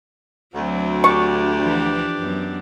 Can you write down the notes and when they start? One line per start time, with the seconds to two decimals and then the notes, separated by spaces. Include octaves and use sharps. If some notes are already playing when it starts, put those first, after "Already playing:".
0.54 D2 F#3 C4
1.04 D4 G4 C#6
1.62 E3 F3 B4
2.18 F#2 B3